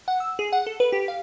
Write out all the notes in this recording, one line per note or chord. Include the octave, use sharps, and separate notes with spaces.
F#5
E6
G#4
F#5
A4
B4
G4
F5